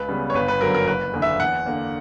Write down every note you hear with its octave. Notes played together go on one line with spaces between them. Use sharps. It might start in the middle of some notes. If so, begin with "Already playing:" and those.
Already playing: C#2 B4
C#3 G3 B3
C#5
G1 B4
B4
F#2 D3 F#3 A#4
A#4
F#1 B4
E2 D3 A#3
E5
E2 F#5
D3 A#3